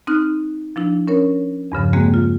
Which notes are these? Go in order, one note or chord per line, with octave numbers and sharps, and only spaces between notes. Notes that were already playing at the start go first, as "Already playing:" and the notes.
C4 D#4 F6 F#6
F3 D4 E4
C#4 A#4 C#5
E2 G2 C#3 F3
G3 G#3 A#3 C4 F#4 G#4
F4